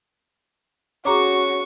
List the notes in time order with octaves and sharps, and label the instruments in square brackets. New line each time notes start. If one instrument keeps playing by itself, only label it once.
[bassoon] C#4 [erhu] F#4 [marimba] G#4 A#5 D6 [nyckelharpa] C#6